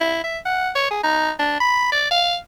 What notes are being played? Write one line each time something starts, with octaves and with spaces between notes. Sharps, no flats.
E4
E5
F#5
C#5
G#4
D#4
D4
B5
D5
F5